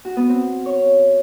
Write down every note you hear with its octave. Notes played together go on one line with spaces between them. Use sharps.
F#4
B3
C4
C#5